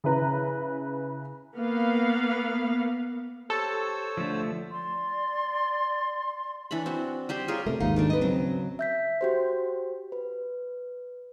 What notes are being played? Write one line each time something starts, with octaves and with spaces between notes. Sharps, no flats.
C#3 E4 B4 A#5
A#3 B3 F5
G4 A4 C5 C#5 E6
D3 F3 A3
D5 C6
E3 D4 C#5 B5
C4 F#4
G3 G4 C5
F4 G#4 A#4 C#5
C3 A3 A#4
G#1 D#2 G#2 D#4 F5
D#3 A3 D4
B4 D#5
C#3 F#3 C4
E5 G6 B6
F#4 G4 C5
B4